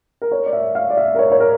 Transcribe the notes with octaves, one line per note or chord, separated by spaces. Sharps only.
A#4
C#5
D5
E5
F5
D5
E5
A#4
C#5
C#5
A#4